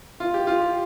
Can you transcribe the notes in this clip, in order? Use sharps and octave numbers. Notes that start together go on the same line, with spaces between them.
F4
G4
F4
G4